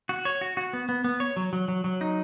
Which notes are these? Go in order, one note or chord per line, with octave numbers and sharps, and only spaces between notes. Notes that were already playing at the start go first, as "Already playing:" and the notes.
F#4
C#5
F#4
F#4
B3
B3
B3
C#5
F#3
F#3
F#3
F#3
D#4